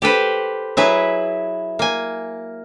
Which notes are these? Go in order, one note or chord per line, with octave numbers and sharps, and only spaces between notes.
G4 A4 B4 C5
F#3 E4 G#4 B4
A#3 G#5